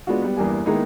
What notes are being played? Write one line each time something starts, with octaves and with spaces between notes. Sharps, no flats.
G#3 B3 D4 F4 F#4
G3 B3
E2 G2 A#3 G4 G#5
D#3 G#3 A#3 B3 D#4 E4